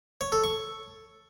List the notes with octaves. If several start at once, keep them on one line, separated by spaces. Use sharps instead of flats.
C#5
A4
C#6